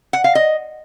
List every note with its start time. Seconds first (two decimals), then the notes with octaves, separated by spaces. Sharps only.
0.13 F#5
0.24 F5
0.35 D#5